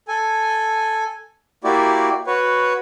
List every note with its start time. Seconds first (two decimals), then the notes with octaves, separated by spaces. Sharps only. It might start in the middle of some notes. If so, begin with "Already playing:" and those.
0.08 A4 G#5
1.64 A#3 E4 F#4 G4 D5
2.27 F#4 B4 C#5